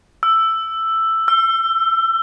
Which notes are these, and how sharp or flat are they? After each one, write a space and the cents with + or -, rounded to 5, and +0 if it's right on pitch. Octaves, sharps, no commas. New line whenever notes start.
E6 +5
E6 +30